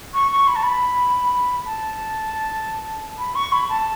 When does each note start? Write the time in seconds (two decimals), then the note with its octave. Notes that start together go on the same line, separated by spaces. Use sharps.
0.14 C#6
0.31 C#6
0.48 B5
0.56 A5
0.63 B5
1.66 A5
3.19 B5
3.35 C#6
3.52 B5
3.70 A5